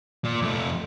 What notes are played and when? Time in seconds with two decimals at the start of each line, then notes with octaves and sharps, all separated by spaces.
0.25 A#2
0.42 F2 A3